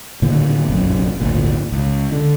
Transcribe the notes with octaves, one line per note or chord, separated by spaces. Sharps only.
A2 D3 D#3 A#3
F1 A#1 F#2
G#1 D2 A#2
C#2
D3